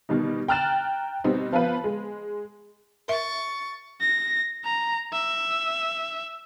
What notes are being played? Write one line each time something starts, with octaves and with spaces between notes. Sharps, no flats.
B2 D#3 G3 D#4
G5 A#5 F6 F#6 A6 E7
B2 G3 B3 C4 D#4
F3 B3 F4 B4
G#3
A#4 E5 C#6 A6
A#6
A#5
E5